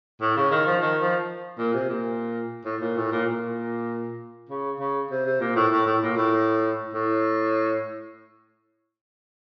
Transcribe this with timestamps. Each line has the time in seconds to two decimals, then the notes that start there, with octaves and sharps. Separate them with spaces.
0.21 A2
0.37 C#3
0.51 D#3
0.66 F3
0.82 D#3
1.02 F3
1.58 A#2
1.74 C3
1.89 A#2
2.65 A2
2.81 A#2
2.96 A2
3.12 A#2
3.27 A#2
4.49 C#3
4.79 C#3
5.11 C3
5.26 C3
5.41 A#2
5.56 A2
5.72 A2
5.86 A2
6.03 A#2
6.17 A2
6.93 A2